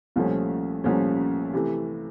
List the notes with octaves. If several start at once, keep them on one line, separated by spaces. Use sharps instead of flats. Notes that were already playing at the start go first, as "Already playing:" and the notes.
C2 A#2 F3 A3 C#4
C2 A#2 F3 A3 C#4
C3 E3 A3